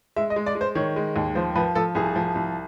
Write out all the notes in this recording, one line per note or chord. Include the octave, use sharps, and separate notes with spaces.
G#3 E5
D#5
G#3
D5
G#3
C5
D#3 C#5
G#3
D#2
F3 C5
F3 B4
F3 A4
C2 G#4
F3
C2